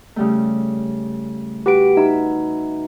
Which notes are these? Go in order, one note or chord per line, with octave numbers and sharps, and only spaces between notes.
C#3 G3 A3
F#4 G4 B4 D7
D#4 E5 B5